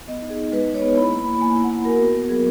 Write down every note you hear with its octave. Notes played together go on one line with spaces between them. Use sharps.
B3 D#5
D#4
G#4
D#4
G#3 B4
D#4
C#5
B3
E4 B5
A#3
B5
A#3
A#3 G#5
E4
F#5
A#3
F#4 A#4
B3
B3
F#3 G#4